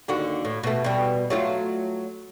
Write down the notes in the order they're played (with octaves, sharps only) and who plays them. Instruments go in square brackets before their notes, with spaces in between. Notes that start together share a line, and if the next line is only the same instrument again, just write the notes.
[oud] D#2 D3 F#4
A2
B2 A3
B2 G3
F#3 A3 F4